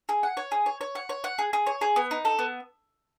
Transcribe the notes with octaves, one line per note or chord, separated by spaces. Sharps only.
G#4
F#5
C#5
G#4
C#5
C#5
F#5
C#5
F#5
G#4
G#4
C#5
G#4
B3
D#4
A4
B3